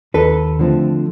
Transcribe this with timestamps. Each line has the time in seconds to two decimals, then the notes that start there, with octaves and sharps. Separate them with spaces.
0.14 D#2 A4 B4
0.59 D3 F3 A3 C4